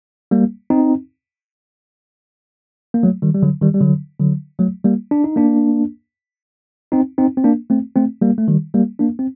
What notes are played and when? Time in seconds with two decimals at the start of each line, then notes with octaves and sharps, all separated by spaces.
0.31 G3 A#3
0.70 C4 D#4
2.94 A#3
3.03 F#3 A3
3.22 D#3 G3
3.34 G3
3.43 D3 F#3
3.61 D#3 G3
3.74 G3
3.81 D3 F#3
4.20 D3 F#3
4.59 F#3 A3
4.85 G3 A#3
5.11 D4
5.24 D#4
5.36 A#3 D4
6.92 C4 D#4
7.18 C4 D#4
7.37 C4
7.44 A#3 D4
7.70 A3 C4
7.96 A3 C4
8.22 G3 A#3
8.38 A3
8.48 D#3 G3
8.74 G3 A#3
8.99 A#3 D4
9.19 C4